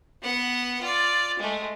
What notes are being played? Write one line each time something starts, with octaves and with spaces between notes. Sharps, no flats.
B3 F#5
F4 D5
G#3 A3